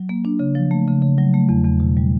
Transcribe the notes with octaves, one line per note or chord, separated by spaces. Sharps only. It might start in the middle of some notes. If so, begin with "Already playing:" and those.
Already playing: F#3
A#3
D4
C#3
F3
A3
C#3
C#3
F#3
A3
E2
E2
B2
G3